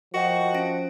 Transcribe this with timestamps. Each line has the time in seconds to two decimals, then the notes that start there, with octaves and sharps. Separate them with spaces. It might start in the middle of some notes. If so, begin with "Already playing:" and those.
0.14 F3 F#4 A#4 D#5 G5
0.54 C#4 A#6 D7